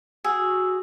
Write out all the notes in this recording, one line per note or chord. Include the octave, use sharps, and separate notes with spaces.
F#4 G#4 E6